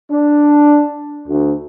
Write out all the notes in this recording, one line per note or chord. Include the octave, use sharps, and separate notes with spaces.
D4
D2